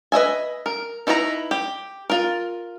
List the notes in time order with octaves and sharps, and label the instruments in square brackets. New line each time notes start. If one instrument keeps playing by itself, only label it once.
[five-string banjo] B4 D#5 E5 G#5
A#4
D#4 E4 B4 C5 A#5
G4
F4 A#4